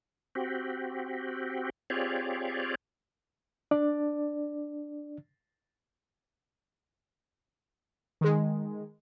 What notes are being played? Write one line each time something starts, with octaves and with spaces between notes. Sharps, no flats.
C4 F#4 G4
C4 F4 G4 G#4 C#5 D5
D4 D5
D#3 G#3